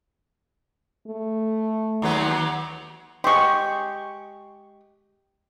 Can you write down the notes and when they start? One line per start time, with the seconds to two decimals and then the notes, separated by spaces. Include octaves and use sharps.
1.08 A3
2.02 D#2 F#3 B4
3.24 G#3 G4 C6 C#6